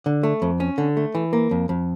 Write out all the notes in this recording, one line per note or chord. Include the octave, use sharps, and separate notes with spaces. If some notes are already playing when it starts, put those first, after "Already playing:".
D3
A3
F2
C#4
D3
A3
E3
A#3
F2
F2